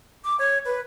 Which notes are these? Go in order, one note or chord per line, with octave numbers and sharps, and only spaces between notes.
D6
C#5
B4